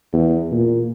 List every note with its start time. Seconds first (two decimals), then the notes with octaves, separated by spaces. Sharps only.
0.13 E2
0.51 A#2